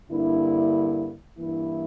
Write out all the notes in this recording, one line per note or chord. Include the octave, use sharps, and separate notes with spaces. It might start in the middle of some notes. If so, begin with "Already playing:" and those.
G2 D3 A#3 E4
G2 E3 A#3 E4